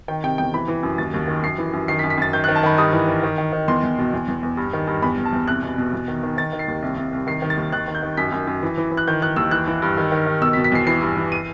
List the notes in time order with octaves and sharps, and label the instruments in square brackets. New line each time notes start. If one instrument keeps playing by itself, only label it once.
[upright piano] D#3 G5
C3 G5
E2 G5
E3 B5
E3
F#2
D#2 A6
D#2
D#3
F#2 C7
E3
F#2
D#3 C7
B6
F#2
B6
F#2 A6
D#3 G6
F#6
D#3
A5
D#3 B5
G2 D#6
E3
E3
D#3
D#3
D#3
E2 C6
E2
B2
E2
E2
E2
G2
D#3
G2
E2 B5
E2
A5
E2
C2 F#6
B2
B2
E2
D#3
D#3
D#3 A6
D#3
C7
D#2
C2
C2
C2
D#3 C7
D#3
A6
D#2
D#3 F#6
D#3
G6
D#3
F#2 B6
F#2
F#2
E3
E3
E3
F#6
D#3 G6
D#3 F#6
D#2 E6
E3 F#6
E3
G2
D#3
D#3
D#3
B2 E6
B6
B2
B6
E2 C7
E3 C7
G2
E3
D#7